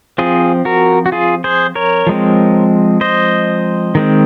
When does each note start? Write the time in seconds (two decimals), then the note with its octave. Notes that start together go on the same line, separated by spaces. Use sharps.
0.18 F3 C4 F4 G#4
0.65 F#4 A#4
1.06 F#4
1.12 F4 G#4
1.44 G#4 C5
1.75 A#4 C#5
2.07 F3 G#3 C4
3.01 C5 D#5
3.95 D#3 G#3 C4